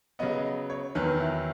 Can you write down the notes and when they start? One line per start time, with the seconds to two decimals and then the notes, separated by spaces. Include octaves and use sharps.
0.19 C#3 F#3 B3 D#5
0.70 C#5
0.95 E2 D#3 F#3 B4
1.20 E4